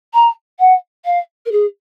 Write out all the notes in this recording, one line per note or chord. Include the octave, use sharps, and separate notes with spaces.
A#5
F#5
F5
A#4
G#4